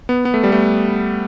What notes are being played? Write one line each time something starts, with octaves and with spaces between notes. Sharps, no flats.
B3
B3
A3
G3
A3